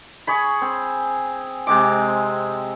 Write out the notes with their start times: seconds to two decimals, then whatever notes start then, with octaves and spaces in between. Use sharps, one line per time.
0.27 G#4 C#5 B5
0.62 C4
1.67 C3 G#3 C4 D6